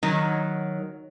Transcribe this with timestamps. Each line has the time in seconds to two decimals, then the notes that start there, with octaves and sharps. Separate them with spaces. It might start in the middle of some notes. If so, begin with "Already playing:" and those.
0.03 D#3 F#3